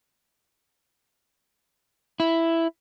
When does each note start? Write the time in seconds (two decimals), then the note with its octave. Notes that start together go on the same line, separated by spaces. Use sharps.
2.20 E4